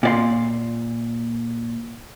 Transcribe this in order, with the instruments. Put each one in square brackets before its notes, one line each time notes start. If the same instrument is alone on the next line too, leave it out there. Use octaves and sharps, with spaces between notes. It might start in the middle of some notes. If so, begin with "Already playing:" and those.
[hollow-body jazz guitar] A#2 D5 C6